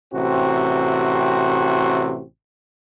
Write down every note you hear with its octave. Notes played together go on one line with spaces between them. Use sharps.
A1 C3 C4 F#4